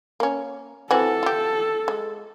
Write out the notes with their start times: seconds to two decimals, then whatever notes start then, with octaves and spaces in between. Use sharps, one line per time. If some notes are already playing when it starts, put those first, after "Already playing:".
0.20 A#3 C#4
0.91 E3 C4 F#4 A4
1.23 F4 G4
1.88 G#3